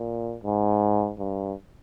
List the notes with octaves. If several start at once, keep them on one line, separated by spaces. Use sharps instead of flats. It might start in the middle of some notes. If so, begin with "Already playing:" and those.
Already playing: A#2
G#2
G2